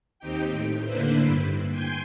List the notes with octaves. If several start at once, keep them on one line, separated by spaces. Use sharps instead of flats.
D#2 C4 D#4 G4 G5
A2
D3 A#3 D4 E4 B4 C5
G2
G5 G#5 C6 G6